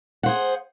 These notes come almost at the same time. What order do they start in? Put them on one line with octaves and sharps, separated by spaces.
F#5 C5 G#4